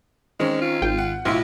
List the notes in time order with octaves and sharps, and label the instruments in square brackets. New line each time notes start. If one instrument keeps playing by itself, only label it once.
[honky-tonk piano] D#3 C4 C#4 [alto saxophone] G#3
[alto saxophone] F4
[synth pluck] G#1 G5
[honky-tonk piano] F#5
[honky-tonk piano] B1 A2 [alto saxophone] E4 [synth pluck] F4